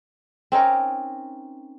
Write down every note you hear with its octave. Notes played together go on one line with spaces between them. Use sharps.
C4 C#4 D#4 A#4